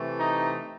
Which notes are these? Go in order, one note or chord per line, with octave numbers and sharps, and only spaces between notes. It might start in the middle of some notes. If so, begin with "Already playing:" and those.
Already playing: C3 E3 A3
D#4